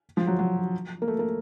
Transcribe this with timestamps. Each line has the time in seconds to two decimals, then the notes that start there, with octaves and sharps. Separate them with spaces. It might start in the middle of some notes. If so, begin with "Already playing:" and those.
0.17 F3
0.27 F#3
0.39 F#3
1.02 A#3
1.08 A3
1.19 A#3